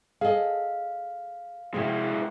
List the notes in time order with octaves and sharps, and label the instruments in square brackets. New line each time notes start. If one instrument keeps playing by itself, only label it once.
[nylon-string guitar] G#4 A4 D#5 [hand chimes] F5
[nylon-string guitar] C3 F3 [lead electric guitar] G#3 E4